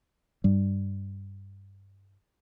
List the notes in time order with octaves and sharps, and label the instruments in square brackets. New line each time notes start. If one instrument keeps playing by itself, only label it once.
[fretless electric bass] G2 G3